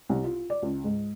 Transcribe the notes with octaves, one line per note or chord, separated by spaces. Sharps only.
C2
F4
D5
C#2
G#2